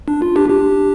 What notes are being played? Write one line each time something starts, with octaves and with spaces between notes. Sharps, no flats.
D4
F4
D4 G4
D4 G4